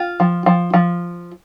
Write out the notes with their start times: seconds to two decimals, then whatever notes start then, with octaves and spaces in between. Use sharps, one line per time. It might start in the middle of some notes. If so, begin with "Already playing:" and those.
Already playing: F4
0.20 F3
0.46 F3
0.73 F3